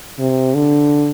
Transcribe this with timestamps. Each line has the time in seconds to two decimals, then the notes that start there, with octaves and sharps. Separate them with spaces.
0.19 C3
0.54 D3